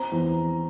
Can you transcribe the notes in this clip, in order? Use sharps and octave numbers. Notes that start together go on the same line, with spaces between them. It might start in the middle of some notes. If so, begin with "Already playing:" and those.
Already playing: C4 A#5
E2